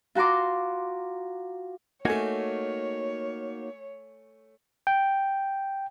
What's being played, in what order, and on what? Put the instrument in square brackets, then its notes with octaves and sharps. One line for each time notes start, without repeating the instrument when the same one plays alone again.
[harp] F4 F#4 A#5 C6 D6
[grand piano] A3 G#5 G#6 [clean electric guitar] A#3 D#4 F#4 [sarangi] C#5
[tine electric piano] G5